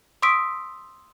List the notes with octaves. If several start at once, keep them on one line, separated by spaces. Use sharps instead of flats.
C6 C#6 D#6 E6 B6 D7